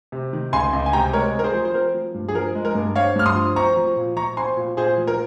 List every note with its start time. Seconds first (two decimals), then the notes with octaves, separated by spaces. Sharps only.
0.12 C3
0.33 D#3
0.53 C#2 G#5 C6
0.73 C#2
0.86 G#5
0.93 C3 G5 A#5
1.13 G#3 A#4 C#5
1.34 C4
1.39 A#4
1.44 G#4 C5
1.54 F3
1.65 C5
1.74 C4 A#4
1.95 F3
2.14 G2
2.29 G#4
2.35 F3 A#4
2.55 G#3
2.65 A#4
2.75 G2
2.96 C4 C#5 F5
3.16 G2 F6
3.26 C6 D#6
3.35 F3
3.56 C4 A#5 C#6
3.76 F3
3.96 A#2
4.16 F3 A#5 C#6
4.37 C4 G#5 C6
4.57 A#2
4.77 A#2 G#4 C5
4.98 F3
5.07 A#4